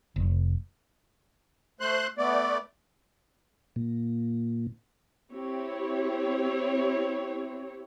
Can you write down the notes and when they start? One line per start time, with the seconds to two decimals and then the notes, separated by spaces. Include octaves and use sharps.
0.16 F1
1.80 A3 C5 C6 F#6
2.18 A3 B3 D5
3.76 A#2
5.32 C4 E4 G4 C#5